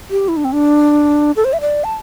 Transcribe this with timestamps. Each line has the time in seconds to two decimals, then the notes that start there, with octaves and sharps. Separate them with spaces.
0.11 G4
0.28 E4
0.37 D4
0.45 C4
0.53 D4
1.36 A4
1.45 C5
1.53 E5
1.61 D5
1.84 A5